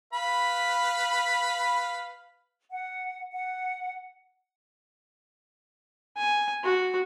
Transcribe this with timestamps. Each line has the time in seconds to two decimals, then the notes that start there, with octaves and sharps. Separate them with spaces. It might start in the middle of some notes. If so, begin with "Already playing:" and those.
0.13 B4 F5 B5
2.71 F#5
3.32 F#5
6.17 G#5
6.64 F#4